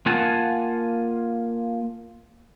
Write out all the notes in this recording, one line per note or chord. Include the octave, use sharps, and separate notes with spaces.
A#3 F4 F5 F#5 G#5 A5